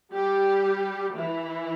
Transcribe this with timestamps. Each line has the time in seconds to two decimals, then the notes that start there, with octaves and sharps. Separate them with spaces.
0.14 G3 G4
1.18 E3 E4